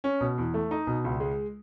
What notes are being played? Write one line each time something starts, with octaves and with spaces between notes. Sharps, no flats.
C#4
B2
E2
A3
D#4
B2
C#2
G#3